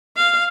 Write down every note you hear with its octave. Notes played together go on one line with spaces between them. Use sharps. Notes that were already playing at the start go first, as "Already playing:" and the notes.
F5